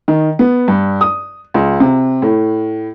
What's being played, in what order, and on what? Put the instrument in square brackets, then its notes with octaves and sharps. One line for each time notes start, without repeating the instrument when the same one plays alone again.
[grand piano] D#3
B3
G2
D#6
C#2
C3
A2